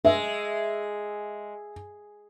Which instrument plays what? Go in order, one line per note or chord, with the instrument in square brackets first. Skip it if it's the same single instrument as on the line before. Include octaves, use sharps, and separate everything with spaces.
[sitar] G#3 [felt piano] E5